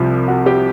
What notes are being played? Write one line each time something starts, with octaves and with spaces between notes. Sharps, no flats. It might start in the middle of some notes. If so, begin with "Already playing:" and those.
Already playing: C2 C3 F3
F#4
G4